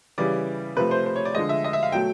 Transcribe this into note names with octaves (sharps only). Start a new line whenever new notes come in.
C#3 E3 G3 D5
C3 F3 A3 B4
C5
C5
C#5
D5
D3 F3 G#3 D#5
E5
D#5
E5
F5
B2 F#3 A3 G5